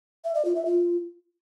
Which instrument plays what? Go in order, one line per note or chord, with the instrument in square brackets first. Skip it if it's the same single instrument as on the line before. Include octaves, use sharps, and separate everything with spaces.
[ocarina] E5
D5
F4
E5
F4